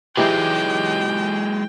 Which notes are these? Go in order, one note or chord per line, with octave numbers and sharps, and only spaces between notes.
E3 F#3 G#3 D#4 G4 D5 G5